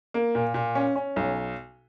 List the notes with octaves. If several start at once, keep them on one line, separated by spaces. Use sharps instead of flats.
A#3
A#2
A#2
C#4
C#4
B1